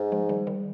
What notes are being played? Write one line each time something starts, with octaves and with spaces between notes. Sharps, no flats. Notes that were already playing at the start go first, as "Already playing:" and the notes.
Already playing: G#2
F3 G#3
D#3 G3
D#3 G3